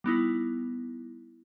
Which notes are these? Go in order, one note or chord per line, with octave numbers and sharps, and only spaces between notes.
G3 B3 D#4 E4